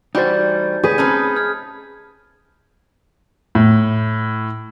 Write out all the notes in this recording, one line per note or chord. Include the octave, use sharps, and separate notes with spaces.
E3 G3 A3 D#4 F#4 C5 G6 A6
D2 C#4 G#4 B4 D#6 G6 B6
A3 C4 C#4 D#4 B4 A5 B5 F6
F6 G#6
A2